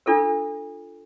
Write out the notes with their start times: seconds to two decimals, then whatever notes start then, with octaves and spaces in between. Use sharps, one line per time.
0.06 D4 F4 A4 A#4